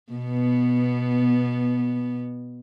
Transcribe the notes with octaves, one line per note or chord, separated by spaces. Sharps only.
B2 B3